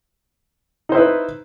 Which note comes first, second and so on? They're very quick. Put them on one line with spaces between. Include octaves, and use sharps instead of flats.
D#4 C5 E4 B4